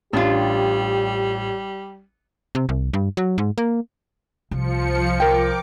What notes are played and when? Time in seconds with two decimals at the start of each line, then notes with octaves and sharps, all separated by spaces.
0.13 A1 G3 D4 F4 G4
2.55 C3
2.69 C2
2.93 G2
3.17 F#3
3.38 G#2
3.58 A#3
4.51 C2 F3 C#7
5.20 A#4 G5 D6